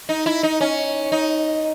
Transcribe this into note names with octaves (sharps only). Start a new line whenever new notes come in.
D#4
E4
D#4
C#4
D#4